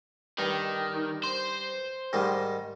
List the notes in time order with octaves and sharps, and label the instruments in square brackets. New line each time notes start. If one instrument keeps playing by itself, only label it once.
[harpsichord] G2 [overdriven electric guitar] D#3
[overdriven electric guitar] C5
[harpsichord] G#2 D#3 G3